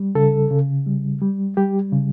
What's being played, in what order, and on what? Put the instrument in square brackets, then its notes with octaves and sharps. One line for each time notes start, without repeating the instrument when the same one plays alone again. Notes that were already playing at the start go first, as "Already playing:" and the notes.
Already playing: [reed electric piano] G3
C#3 A4
C#3
G3
G3
G3 G4
C#3